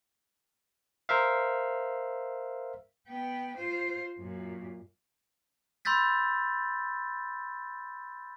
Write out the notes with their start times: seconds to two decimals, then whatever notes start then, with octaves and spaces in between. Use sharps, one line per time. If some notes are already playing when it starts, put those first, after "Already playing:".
1.09 A#4 C5 E5 F5
3.08 B3 G5
3.57 F4 C5
4.19 F#2 A#2
5.85 B5 C6 E6 G6 A6 B6